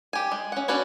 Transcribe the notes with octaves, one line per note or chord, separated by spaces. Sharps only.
G4 G#5
G#3
C#4 F#5
C#4 D4 F#4 B4 C#5